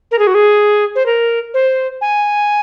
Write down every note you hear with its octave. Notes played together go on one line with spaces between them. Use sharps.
A#4
G#4
F#4
G#4
C5
A#4
C5
G#5